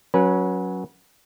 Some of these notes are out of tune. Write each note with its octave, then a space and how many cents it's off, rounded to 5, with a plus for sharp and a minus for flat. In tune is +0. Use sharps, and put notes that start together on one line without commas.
F#3 +0 C#4 +0 B4 -30